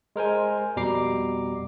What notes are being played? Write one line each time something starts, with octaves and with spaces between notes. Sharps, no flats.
G#3 A#4 C5 G#5
F2 B2 G3 A#5 D6 C7